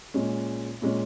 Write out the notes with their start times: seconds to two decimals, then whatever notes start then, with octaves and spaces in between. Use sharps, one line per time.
0.14 A#2 G#3 C#4
0.82 A#2 G#3 C#4